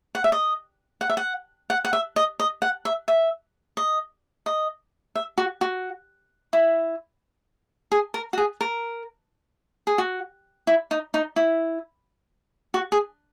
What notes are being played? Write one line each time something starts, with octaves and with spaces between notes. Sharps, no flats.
F#5
E5
D#5
F#5
E5
F#5
F#5
F#5
E5
D#5
D#5
F#5
E5
E5
D#5
D#5
E5
F#4
F#4
E4
G#4
A#4
F#4
G#4
A#4
G#4
F#4
E4
D#4
D#4
E4
F#4
G#4